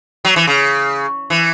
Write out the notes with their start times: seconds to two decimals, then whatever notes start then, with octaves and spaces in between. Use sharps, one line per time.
0.25 F#3
0.36 E3
0.47 C#3
1.30 E3